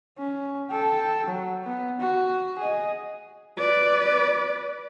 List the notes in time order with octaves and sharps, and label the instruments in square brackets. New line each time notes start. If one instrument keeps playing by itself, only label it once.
[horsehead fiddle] C#4
A4 G5
F#3
B3
F#4
G#4 D#5
B4 D5